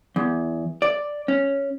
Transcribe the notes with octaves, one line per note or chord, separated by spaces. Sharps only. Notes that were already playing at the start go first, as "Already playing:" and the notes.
E2
D5
C#4